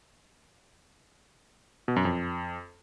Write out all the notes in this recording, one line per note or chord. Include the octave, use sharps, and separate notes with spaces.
B2
F#2
F2